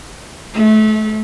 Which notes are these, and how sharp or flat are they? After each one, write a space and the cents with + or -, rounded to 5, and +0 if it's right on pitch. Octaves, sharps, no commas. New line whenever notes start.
A3 -30